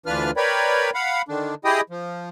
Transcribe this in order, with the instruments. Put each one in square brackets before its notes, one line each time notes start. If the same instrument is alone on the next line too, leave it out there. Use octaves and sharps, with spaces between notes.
[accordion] D2 E3 D4 F4 B4 F6
A#4 B4 C#5 D5 G5 B5
F5 F#5 B5
D3 D#3 D4
E4 G4 G#4 D#5 G5 D#6
F3